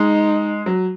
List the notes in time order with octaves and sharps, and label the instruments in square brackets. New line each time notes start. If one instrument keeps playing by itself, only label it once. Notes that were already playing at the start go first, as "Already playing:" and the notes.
Already playing: [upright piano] G#3 [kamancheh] D#4
[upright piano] F#3